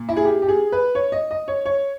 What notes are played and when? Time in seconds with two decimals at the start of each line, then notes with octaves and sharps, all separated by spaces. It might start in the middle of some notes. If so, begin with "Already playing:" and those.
Already playing: A#2
0.09 E4
0.17 G#4
0.25 G4
0.42 G4
0.49 G#4
0.72 B4
0.95 C#5
1.12 D#5
1.31 D#5
1.48 C#5
1.65 C#5